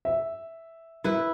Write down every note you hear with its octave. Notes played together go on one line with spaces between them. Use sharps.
E5
E4 B4